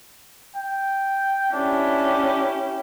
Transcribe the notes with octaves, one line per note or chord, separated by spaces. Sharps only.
G5
C#4 D4 E4 G4